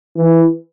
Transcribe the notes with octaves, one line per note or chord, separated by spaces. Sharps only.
E3